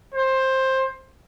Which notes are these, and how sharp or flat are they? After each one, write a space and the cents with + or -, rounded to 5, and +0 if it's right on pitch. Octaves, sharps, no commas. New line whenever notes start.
C5 +15